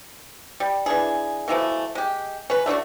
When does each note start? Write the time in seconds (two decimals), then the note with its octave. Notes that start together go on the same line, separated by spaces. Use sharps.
0.60 G3
0.86 E3 D4 G#4
1.48 B2 E3 F3 A3
1.95 G#3 G4
2.50 C#4 B4
2.66 A3 D4 F4 F#4